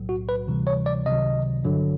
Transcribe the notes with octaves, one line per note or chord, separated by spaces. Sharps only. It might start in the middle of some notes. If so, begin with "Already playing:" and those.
Already playing: B1 A2 F#3
F#4
B4
D2 C3 E3 G3
C#5
D5
C#2 C3 D#3 F#3 D#5
A1 G2 D3 F#3